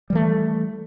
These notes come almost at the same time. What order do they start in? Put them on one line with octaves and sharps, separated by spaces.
G3 E3 A3